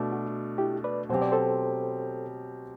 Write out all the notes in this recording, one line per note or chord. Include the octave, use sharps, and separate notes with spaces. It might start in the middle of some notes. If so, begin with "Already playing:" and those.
Already playing: B2 A3 D4
F#4
E4 G4
B4 D5
B2 F#3 C4 G4 C5
D5
A4 C5